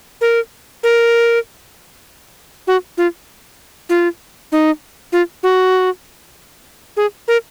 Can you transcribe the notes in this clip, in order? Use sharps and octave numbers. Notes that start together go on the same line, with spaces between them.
A#4
A#4
F#4
F4
F4
D#4
F4
F#4
G#4
A#4